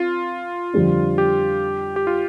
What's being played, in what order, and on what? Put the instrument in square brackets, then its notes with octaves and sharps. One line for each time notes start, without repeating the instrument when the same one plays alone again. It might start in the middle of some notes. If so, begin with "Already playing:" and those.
Already playing: [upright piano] C4 [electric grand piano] F4
[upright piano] F2 D3 G3 D4
[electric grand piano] G4
G4
F4